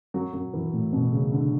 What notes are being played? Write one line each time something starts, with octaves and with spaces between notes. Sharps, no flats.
F#3
F#3
E3
A2
B2
C#3
D3